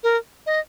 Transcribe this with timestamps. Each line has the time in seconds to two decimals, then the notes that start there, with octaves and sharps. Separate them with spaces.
0.03 A#4
0.46 D#5